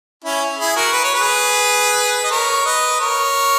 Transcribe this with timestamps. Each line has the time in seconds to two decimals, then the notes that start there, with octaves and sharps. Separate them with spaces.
0.25 C#4 E4
0.59 E4 G#4
0.76 F#4 A#4
0.93 B4
1.04 C#5
1.14 G#4 B4
2.24 D#5
2.31 A#4 C#5
2.65 B4 D#5
3.00 A#4 C#5